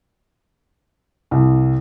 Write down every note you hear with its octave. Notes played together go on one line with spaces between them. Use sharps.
C2